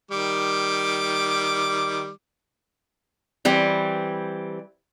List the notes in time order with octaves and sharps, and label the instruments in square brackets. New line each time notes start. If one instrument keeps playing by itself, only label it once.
[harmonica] D#3 G3 D6
[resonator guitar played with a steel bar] E3 G3 C4